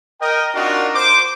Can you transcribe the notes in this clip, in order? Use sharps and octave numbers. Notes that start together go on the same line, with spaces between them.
A#4 D#5 G5
C4 D4 D#4 F4 F#4 A#4
C5 D6